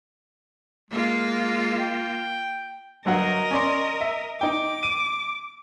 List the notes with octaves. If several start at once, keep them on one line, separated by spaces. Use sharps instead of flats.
G#3 A#3 F4
G5
G1 F#3 A#4 D#5 F#5
C#4 D5 C6
E5
D#4 G5 D6
D#7